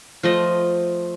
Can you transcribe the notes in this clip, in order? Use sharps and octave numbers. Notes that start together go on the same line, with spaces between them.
F3 A3 D#5